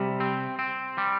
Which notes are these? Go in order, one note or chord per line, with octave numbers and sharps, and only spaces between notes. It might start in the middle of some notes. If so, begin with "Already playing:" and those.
Already playing: C3 G3
C4
C4
G3